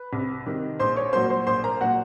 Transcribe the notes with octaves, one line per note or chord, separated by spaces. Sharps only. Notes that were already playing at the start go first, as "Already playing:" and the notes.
Already playing: B4
C2
C3 D#3
A#1 C5 C6
C#5 C#6
A#2 F#3 A#3 C5 C6
C5 C6
A#1 C5 C6
A#4 A#5
A#2 F#3 A#3 F#4 F#5